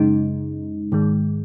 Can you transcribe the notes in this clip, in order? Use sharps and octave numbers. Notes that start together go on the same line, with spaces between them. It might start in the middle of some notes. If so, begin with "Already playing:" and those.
Already playing: F#2 C#3 G#3 D#4
G#2 D#3 G#3